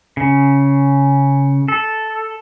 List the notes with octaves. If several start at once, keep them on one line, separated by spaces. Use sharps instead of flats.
C#3
A4